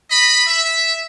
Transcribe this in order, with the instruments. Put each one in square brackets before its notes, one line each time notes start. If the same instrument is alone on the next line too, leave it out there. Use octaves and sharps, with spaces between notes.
[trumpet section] D#5 B5
E5